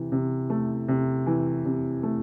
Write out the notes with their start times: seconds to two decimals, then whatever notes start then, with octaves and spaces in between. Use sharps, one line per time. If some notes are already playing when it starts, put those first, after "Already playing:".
Already playing: C3 E3
0.12 C3
0.50 A3
0.88 C3
1.26 E3
1.65 C3
2.03 A3